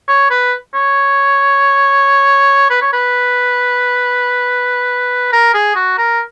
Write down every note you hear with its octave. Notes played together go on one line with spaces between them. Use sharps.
C#5
B4
C#5
B4
C#5
B4
A#4
G#4
F#4
A#4